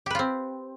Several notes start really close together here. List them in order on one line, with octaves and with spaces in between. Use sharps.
G4 B4 F4 C4